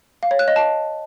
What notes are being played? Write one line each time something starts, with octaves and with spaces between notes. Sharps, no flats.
F5
C#5
F#6
D#5
A5